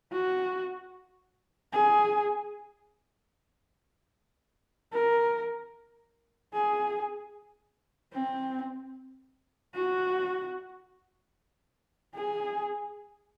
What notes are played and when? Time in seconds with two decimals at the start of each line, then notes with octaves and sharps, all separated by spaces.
0.12 F#4
1.73 G#4
4.93 A#4
6.54 G#4
8.14 C4
9.75 F#4
12.15 G#4